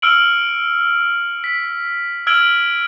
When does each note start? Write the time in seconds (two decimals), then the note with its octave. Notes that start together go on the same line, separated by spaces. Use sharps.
0.02 E6 F6 C#7 D7 F#7
1.44 B6
2.27 E6 F6 G#6 D7 F#7